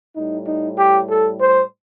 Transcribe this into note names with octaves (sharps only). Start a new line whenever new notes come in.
A2 G3 D#4
D#4
G4
A4
C5